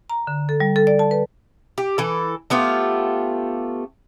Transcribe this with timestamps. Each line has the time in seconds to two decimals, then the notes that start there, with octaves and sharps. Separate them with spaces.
0.10 A#5
0.27 D3
0.49 A4
0.60 G3
0.76 A4
0.87 D5
0.99 A5
1.11 B4
1.78 G4
1.98 E3 A4
2.50 A3 B3 F4 G4